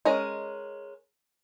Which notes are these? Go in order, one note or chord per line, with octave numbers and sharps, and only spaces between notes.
G#3 C#4 A#4 D#5